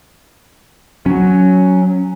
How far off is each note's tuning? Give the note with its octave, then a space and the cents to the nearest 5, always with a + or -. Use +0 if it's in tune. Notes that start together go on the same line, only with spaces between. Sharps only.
F#3 +0 C#4 +10